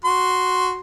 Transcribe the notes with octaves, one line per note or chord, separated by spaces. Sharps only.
F#4 C6